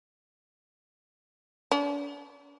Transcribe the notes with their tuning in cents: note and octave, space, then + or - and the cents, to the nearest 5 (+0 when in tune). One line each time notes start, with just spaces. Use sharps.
D4 -40